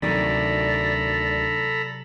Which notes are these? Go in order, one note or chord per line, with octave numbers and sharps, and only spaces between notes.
D2 C3 D#3 F#3 A4 D5 A#5 B5